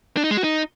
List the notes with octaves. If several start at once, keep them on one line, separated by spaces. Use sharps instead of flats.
D4
D#4
G#3
F#4
D#4